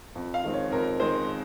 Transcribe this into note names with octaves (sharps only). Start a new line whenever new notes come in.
F2
F5
D#3 G#3 C4
C#5
F2 A#4
D#3 G#3 C4 C5